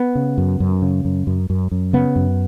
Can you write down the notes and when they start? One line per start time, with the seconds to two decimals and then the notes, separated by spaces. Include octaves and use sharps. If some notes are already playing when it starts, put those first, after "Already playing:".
Already playing: B3
0.15 C#3
0.38 F#2
0.60 F#2
0.82 C#3
1.05 F#2
1.27 F#2
1.50 F#2
1.71 F#2
1.93 C#3 B3
2.16 F#2